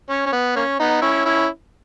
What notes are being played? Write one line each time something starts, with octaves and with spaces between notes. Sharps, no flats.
C#4
C#4
B3
A#3 C#4
B3 D#4
C#4 E4
C#4 E4